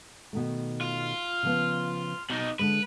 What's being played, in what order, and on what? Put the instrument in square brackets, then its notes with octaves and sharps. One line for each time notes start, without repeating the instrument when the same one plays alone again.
[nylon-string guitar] B2 D#3 A3
[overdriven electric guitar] F4
[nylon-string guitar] C#3 F3 B3
[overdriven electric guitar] B2 D#4
[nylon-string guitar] D3 G#3 [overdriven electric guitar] B4